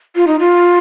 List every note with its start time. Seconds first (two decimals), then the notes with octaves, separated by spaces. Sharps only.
0.16 F4
0.27 D#4
0.39 F4